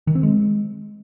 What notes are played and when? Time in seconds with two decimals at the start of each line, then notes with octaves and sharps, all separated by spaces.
0.07 D#3
0.15 C4
0.23 G#3